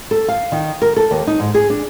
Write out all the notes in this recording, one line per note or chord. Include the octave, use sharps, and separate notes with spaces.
A4
F5
D#3
A#4
A4
D#2
D#4
G#2
G#4
D4